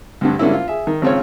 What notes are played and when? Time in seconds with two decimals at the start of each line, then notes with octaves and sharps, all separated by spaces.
0.21 D2 G2 D3
0.39 G#2 D3 G3 A#3 C#4 E4
0.53 F4
0.68 G#4 E5
0.87 D#3
1.02 G#1 C#3 C4 F4 C#5